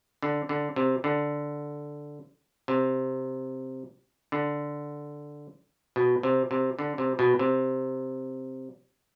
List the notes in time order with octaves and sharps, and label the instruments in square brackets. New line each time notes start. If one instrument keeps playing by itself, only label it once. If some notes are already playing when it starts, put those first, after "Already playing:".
[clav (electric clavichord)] D3
D3
C3
D3
C3
D3
B2
C3
C3
D3
C3
B2
C3